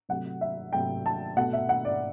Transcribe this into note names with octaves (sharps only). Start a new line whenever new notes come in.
C3 F#3 A3 F#5
E5
C3 F#3 A3 G5
A5
B2 A3 F#5
E5
F#5
D5